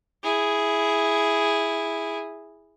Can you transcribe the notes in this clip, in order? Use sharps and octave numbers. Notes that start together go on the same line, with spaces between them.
E4 G#4